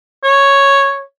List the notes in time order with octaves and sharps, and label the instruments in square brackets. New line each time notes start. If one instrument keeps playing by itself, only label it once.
[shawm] C#5